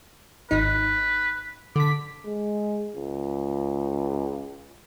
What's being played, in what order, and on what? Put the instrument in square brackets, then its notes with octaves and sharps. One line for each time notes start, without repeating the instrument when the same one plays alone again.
[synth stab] G#1 D#4 [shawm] B4
[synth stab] D3 B6 [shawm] D6
[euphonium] G#3
C#2